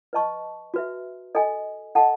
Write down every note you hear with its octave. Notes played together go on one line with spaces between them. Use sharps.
B4 D#5 A5 C#6
F#4 B4 E5
A4 D#5 G#5
A4 D#5 F#5 A5